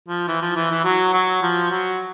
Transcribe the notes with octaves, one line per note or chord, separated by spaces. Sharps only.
F3
E3
F3
E3
E3
F#3
F#3
F3
F#3